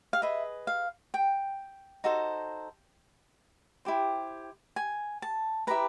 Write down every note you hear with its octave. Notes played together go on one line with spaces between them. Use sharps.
F5
G#4 B4 D#5 E5
F5
G5
D#4 F#4 A4 C5
E4 G4 C5
G#5
A5
E4 G4 B4 A#5